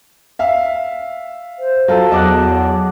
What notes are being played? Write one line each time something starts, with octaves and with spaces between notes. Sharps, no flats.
E5 F5
C5
F#3 F4 A4
E2 F#3 D#5 A5 D6 F#6